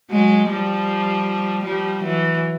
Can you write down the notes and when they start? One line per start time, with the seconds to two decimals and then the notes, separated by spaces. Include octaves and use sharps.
0.10 F#3 G#3
0.49 F3 G3
1.64 F3 G3
2.03 E3 F#3